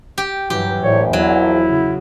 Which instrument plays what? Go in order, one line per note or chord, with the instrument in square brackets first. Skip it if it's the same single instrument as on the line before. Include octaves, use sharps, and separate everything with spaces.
[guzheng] G4
[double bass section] G2 E3 F#3 [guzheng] G4
[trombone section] A#1 [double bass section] A2 [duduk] C#5
[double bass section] E2 [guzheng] F#3 [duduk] E4
[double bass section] C#3